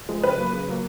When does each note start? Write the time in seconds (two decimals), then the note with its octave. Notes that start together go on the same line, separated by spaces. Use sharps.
0.09 F3 G#3
0.23 C#3 B4
0.37 F#3 A#3
0.53 C#3
0.68 F#3 A#3